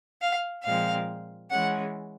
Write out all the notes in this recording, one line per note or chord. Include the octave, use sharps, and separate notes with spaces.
F5
A#2 F3 G#3 C4 F5
E3 G#3 C#4 F#5